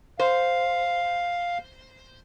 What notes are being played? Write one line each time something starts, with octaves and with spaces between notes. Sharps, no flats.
C5 F5